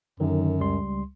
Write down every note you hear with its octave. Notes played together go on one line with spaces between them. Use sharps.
F#2 D3 D#3 F#3
C#2 G3 C6